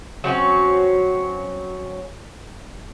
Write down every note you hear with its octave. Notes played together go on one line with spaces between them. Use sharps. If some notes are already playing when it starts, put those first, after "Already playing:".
F#3 C4 C#4 F#4